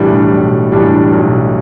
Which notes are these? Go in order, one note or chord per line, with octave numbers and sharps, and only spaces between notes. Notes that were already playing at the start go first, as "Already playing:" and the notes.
Already playing: B1 A2 E3 G3 D4
B1
A2 E3 G3 D4
B1